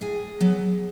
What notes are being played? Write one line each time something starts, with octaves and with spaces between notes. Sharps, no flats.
A2 G#4 G#5
F#3 B3